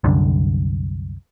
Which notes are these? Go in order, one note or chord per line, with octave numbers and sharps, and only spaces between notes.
C2 F#2 D3